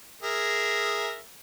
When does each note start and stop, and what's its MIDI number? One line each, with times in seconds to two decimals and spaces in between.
0.23 1.18 68
0.23 1.18 70
0.23 1.18 76